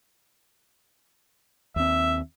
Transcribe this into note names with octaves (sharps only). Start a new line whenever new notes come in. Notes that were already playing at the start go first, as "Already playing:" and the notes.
D#2 C4 E5